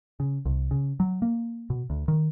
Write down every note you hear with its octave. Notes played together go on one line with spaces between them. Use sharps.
C#3
C2
C#3
F#3
A#3
B2
D2
D#3